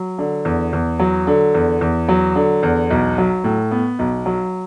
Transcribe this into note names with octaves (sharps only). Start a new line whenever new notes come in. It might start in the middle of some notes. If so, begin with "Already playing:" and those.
Already playing: F#3
D3
E2
E2
F#3
D3
E2
E2
F#3
D3
E2
B1
F#3
A2
B3
B1
F#3